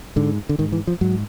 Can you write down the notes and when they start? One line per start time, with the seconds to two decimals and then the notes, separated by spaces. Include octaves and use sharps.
0.16 G#2 D3
0.49 D3
0.58 G#2 D#3
0.72 E3
0.87 F3
1.01 G#2 F#3